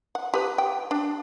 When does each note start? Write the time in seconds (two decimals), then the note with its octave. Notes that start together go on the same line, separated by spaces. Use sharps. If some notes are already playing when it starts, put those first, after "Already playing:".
0.15 F#5
0.34 G4 B4
0.58 G5
0.91 D4